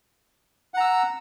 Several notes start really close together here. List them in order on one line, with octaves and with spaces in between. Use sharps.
F#5 A#5 E6